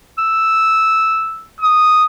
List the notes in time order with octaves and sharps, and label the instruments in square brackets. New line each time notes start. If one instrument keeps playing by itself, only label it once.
[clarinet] E6
[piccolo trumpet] D#6